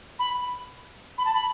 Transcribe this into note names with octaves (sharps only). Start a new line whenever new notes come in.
B5
B5
A5
B5